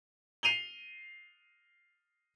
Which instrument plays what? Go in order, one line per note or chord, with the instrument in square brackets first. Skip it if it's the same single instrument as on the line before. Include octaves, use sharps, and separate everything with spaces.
[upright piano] C7 D#7 F7 G7